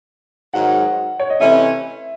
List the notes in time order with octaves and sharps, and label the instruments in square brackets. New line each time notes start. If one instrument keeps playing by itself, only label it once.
[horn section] G#2 D#3 F#3 [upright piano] F#5
[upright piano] C#5
D#5
[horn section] C3 E3 A3 C#4 [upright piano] E5